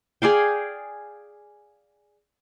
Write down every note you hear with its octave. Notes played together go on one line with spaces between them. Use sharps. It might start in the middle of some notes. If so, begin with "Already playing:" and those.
G#4 D5 F5 G5